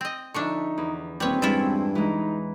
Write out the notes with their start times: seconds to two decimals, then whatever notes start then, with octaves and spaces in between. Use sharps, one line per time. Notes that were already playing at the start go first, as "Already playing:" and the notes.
0.01 C4 D#5
0.34 D3 F3 D4 D#4 E5 C#6
0.78 E2
1.20 D#1 G3 B3 C4 B4 C#5
1.42 G2 G#3 C#4 E4 F4 A4
1.95 E3 G#3 D#4